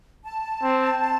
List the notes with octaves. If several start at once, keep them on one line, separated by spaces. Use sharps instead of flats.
A5
C4